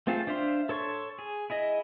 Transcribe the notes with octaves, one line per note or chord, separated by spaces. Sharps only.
A3 C4 F4 G#4 A4
D4 C5 E5 F5 C6
A4 C#5 C6 C#6
G#4
E4 G#4 D#5